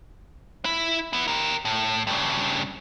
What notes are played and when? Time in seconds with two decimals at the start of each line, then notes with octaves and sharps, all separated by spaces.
0.65 E4
1.13 B3 E4
1.28 G4 A#4
1.65 A2
2.07 G2 C#3